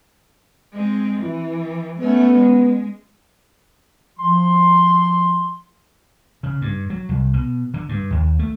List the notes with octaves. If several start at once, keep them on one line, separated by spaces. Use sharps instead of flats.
G#3 C4
E3 E4
A3 B3 C#4
G#3
F3 C6
C#3
G2
F#3
C2
B2
D3
G2
D#2
A3